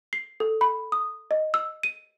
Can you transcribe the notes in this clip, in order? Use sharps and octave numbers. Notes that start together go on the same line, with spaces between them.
C7
A4
B5
D#6
D#5
E6
D#7